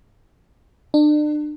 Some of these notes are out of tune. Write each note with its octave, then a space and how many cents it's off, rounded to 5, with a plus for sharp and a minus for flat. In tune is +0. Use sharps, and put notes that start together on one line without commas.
D4 +35